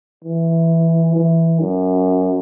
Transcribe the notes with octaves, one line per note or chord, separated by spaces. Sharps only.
E3
E3
F#2